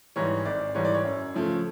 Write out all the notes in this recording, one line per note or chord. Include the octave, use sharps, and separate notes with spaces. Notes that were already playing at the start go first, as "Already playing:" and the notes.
G#2 E3 G3 C#5
G#1 D5
G#2 E3 G3 C#5
D5
C#5
F#2
C#3 F3 A3